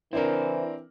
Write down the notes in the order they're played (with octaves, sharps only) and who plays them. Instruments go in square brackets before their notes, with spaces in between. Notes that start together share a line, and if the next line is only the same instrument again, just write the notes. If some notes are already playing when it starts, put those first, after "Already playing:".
[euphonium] E3 [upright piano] C4 D4 A#4 [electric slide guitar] E4 C5